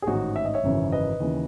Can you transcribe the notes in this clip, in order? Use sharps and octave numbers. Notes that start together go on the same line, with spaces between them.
G#4
A1 G#2 D#3 D#4 F#4
E5
D#5
C#5 E5
G#1 F#2 C#3 E3
B4 D#5
D#2 C#3 E3